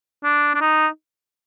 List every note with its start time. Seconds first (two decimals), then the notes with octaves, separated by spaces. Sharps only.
0.24 D4
0.55 D4
0.61 D#4